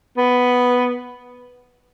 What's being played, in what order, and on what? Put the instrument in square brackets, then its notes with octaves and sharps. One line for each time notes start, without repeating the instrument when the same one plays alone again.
[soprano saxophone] B3